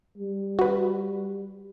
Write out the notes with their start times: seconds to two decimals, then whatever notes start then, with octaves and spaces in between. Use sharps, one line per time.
0.18 G3
0.59 F#4 B4